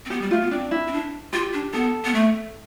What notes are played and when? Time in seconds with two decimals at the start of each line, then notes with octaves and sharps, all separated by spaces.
0.05 C4
0.10 B3 G4
0.22 G3
0.31 A3 F4
0.41 B3
0.51 C4 D4
0.71 E4
0.88 C4
0.93 D4
1.33 F4 G4
1.53 D4
1.73 B3 A4
2.04 B3
2.14 A3